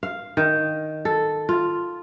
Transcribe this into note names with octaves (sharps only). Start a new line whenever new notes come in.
F5
D#3
A4
F4